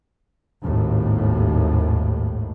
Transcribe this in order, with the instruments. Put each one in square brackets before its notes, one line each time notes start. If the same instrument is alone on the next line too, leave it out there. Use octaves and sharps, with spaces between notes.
[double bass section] G#1 D#2 A2